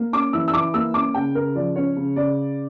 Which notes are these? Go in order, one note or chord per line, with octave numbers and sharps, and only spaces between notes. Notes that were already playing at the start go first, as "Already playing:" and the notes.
Already playing: A#3
C#4 D6
E3 E6
E6
E3 D6
A#3 E6
C#4 D6
C#3 G5
C#3 A#4
F3 D5
C#4 C#5
C#3
C#3 D5